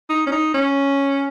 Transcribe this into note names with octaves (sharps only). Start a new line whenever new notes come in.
D#4
C#4
D#4
C#4